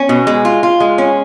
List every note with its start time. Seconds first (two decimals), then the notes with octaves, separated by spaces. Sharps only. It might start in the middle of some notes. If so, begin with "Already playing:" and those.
Already playing: C#4
0.09 B2
0.27 G#3
0.45 F4
0.63 F4
0.80 G#3
0.98 C#4